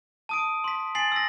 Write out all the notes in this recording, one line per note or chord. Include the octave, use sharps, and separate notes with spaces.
A5 D#6 D7
C6 B6
G#5 A6 B6 C7 F#7
E6 A#6